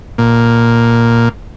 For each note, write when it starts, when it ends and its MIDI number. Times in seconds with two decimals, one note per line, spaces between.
0.18 1.29 46